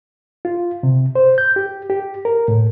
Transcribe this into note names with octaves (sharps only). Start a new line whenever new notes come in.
F4
C3
C5
G6
G4
G4
A#4
A2